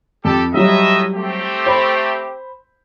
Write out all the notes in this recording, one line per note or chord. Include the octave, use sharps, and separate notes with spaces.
F2 G4 A4
A2 F#3 G3 D#5 E5
A3 C4 G4
C5 B5